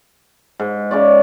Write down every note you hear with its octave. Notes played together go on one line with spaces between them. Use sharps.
G#2
C#3 C#5 D5